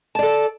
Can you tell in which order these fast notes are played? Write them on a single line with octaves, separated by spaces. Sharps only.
A5 D5 A4